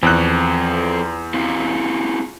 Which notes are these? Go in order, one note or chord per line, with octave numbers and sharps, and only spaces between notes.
E2 F3 C4 F#6
C4 E4 F4